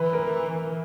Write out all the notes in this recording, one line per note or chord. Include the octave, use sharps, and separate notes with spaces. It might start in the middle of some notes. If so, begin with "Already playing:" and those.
Already playing: E3 B4
A#4